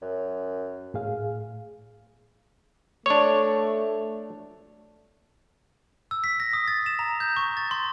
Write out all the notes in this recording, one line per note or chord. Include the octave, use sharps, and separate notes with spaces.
F#2
A2 G#4 F5
A3 D4 C#5
E6
B6
A#6
D#6
A6
E7
A#5
G6
C#6
A6
C6